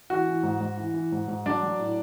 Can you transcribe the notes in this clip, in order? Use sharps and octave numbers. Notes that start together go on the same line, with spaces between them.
E3 F#4
E3
G#2
G#2
E3
E3
G#2
G#2
F#3 D4 D5
F#3
A2